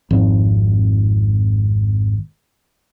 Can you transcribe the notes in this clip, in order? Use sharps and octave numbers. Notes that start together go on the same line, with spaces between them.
G#1 F2